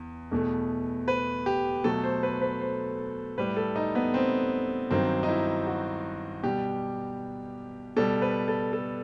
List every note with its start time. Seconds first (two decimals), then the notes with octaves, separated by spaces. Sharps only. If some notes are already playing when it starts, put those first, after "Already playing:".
Already playing: E2
0.31 E2 B2 A3
1.08 B4
1.46 G4
1.84 B2 F#3 A3 A4
2.03 C5
2.23 B4
2.41 B4
2.61 C5
3.38 A2 G3 B4
3.57 A4
3.76 D#4
3.95 B3
4.14 C4
4.91 G2 D#3 F#3 C4
5.23 D#4
5.29 E4
5.67 F#4
6.43 B2 G3 G4
7.97 B2 G3 A4
8.22 B4
8.48 A4
8.73 A4